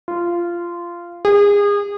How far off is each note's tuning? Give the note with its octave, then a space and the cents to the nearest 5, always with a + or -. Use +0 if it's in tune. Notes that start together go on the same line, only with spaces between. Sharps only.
F4 -15
G#4 -30